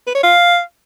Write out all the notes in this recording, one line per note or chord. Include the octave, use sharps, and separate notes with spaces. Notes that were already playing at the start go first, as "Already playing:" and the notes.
B4
C#5
F5